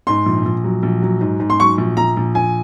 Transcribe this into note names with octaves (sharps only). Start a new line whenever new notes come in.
G#2 C6
A#1
A#1
F#3
A#1
F#3
G#2
G#2
C6
F#3 C#6
A#1
A#1 A#5
A#1
A#1 G#5